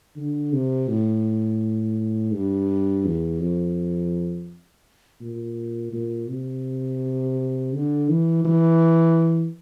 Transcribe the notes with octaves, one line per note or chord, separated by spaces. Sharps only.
D3
C3
A2
G2
E2
F2
A#2
A#2
C3
D3
E3
E3